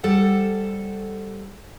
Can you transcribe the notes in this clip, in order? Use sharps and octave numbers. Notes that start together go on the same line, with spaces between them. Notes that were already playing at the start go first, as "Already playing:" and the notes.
G3 A4 C5 F#5